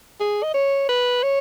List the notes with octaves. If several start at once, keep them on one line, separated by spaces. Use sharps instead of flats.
G#4
D#5
C#5
B4
C#5